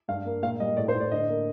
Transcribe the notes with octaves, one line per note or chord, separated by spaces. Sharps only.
G2 F5
A#3
A#2 F5
G3 D#5
A2 D5
C5
A2
D5
D3 D#5
A#3